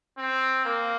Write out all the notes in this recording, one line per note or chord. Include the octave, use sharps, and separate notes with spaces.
C4
A#3